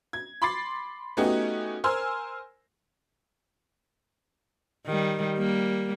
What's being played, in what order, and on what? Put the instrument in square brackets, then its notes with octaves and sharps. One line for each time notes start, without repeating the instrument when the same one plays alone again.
[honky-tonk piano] G#6
B5 C6 D6 A6 C7
A3 B3 C#4 D#4 F#4 G4
A#4 C5 G#5 C6 E6 F6
[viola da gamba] D#3 G3
G3 A#3